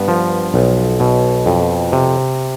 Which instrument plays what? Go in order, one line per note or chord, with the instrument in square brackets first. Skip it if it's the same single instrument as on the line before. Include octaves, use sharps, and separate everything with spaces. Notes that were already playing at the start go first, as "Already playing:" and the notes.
Already playing: [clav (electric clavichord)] G2 B3
F3
B1
B2
F2
C3